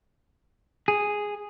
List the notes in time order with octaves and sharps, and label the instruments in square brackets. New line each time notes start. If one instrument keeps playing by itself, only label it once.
[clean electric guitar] G#4